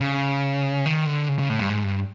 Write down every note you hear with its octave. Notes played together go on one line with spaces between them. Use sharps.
C#3
D#3
D3
C#3
C#3
A2
G2
G#2
G2